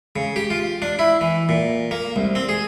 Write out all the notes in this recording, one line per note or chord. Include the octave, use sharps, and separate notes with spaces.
C#3
G4
F4
D4
E4
E3
A#2
A#3
C2
C4
G#4